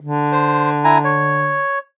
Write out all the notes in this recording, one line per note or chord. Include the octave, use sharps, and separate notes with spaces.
D3
C5
E4 G#5 A#5
C#5